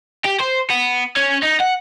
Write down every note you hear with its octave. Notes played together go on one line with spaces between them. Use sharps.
G4
C5
B3
C#4
D#4
F#5